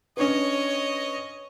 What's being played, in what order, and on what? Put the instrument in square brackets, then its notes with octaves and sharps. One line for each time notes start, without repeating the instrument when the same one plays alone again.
[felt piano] C#4 D4 B4 [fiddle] C#5 D#5